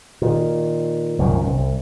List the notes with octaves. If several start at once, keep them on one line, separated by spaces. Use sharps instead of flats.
A#2 D#3
C2 F#2 A#2 D#3
C2